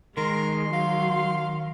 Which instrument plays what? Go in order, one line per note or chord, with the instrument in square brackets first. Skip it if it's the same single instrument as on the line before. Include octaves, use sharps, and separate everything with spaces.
[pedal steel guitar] D#3 [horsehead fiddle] G#3 [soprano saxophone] A#4 [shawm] C6
[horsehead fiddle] F#3 [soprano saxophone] F5